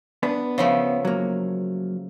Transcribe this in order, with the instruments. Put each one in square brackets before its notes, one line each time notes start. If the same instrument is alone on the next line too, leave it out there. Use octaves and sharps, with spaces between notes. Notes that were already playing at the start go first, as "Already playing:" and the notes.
[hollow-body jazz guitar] B3 D4 B4
[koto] C#3 F3 A3
[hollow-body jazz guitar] F#3 A#3